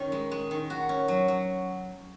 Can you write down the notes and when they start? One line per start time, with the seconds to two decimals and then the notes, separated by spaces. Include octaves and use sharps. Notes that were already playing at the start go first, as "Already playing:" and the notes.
Already playing: D#3 C#4
0.12 G#3
0.31 G#3
0.51 D#3
0.70 F#4
0.89 C#4
1.08 F#3
1.28 F#3